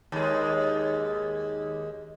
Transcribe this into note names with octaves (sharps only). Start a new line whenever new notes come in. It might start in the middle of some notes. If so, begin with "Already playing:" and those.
D#2 G#3